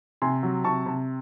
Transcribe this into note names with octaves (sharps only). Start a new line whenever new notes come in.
C3 G#5 C6
F#3
C3 A5 C#6
C3